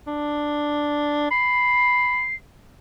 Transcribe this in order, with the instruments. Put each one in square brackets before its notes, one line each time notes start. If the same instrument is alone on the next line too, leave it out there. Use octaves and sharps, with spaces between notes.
[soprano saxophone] D4
[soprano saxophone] B5 [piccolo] C7